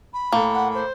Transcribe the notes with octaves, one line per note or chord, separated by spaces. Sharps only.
B5
A2 A#3 A4
F#5
C5